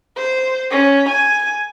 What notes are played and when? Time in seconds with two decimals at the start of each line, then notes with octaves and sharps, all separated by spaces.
0.17 C5
0.71 C#4
1.09 G#5